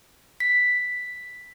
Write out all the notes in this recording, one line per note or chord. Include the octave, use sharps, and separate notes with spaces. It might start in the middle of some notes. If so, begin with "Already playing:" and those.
B6